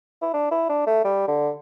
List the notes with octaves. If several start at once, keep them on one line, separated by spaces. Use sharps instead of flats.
E4
D4
E4
D4
A3
G3
D3